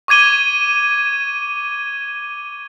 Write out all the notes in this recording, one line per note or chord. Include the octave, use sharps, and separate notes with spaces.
C#6 D6 G#6 D#7 G7